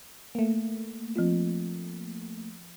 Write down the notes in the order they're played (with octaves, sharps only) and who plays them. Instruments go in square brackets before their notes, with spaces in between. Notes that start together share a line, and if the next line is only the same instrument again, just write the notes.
[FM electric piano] A3 A#3
[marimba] F3 C4 F4